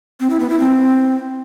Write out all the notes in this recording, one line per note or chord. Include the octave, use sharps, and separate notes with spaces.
C4
E4
B3
E4
C4